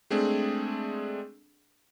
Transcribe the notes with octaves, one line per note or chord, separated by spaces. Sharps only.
G#3 A3 C4 D4 G#4